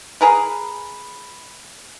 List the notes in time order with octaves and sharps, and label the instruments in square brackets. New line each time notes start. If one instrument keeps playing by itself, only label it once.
[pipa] G#4 A#4 B4